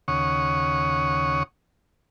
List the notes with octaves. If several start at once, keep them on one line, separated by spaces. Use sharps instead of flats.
D#2 C#3 C#5 F#5 C#6 D#6